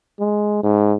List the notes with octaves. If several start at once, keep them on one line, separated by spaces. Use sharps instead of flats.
G#3
G#2